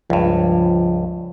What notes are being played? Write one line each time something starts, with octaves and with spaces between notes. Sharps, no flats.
C#2 G2 F3